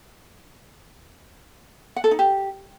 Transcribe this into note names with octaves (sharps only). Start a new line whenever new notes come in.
F#5
A4
D#4
G4